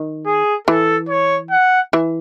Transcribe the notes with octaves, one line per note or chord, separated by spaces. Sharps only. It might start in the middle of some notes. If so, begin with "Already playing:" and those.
Already playing: D#3
G#4
E3 A4
C#5
F#5
E3